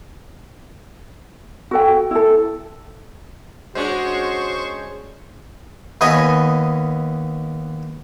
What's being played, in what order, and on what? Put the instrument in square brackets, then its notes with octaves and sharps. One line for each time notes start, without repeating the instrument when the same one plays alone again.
[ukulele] F#4 A4 G5
E4 A4
[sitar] G#3 C#4 D4 [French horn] F#4 [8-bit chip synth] C5 C#6
[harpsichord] D#2 B3 C#5 D#5 G#5